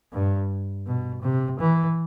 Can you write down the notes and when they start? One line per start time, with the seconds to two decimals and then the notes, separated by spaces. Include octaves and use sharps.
0.12 G2
0.86 B2
1.22 C3
1.59 E3